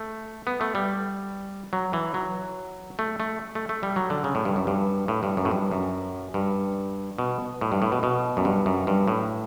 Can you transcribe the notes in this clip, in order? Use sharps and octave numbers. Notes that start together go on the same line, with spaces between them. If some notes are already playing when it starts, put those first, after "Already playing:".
Already playing: A3
B3
A3
G3
F#3
E3
F#3
A3
A3
A3
A3
G3
F#3
D3
C#3
A2
G2
F#2
G2
A2
G2
F#2
A2
G2
F#2
G2
B2
A2
G2
A2
B2
B2
F#2
G2
F#2
G2
A2